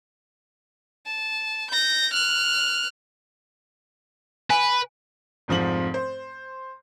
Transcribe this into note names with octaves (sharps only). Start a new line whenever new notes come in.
A5
G6 A#6
F6 F#6
B4 G#5
F1 G#2 F3 C4 F#7
C5